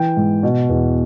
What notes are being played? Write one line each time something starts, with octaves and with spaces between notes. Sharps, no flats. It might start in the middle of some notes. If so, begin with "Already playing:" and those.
Already playing: E3 G5
G#2
B2
E2